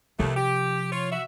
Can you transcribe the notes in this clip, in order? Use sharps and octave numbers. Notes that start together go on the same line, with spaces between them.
D#2 C3 F3 A3
G4
F4 C#5
F#4 E5